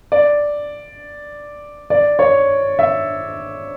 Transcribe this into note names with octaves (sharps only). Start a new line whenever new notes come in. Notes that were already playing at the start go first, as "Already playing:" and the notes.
D5
D5
C#5
E5